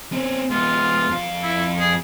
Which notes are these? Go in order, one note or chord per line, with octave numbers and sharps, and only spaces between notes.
C4 C#4
G#3 B3 F4
F2 F5
E4
G#4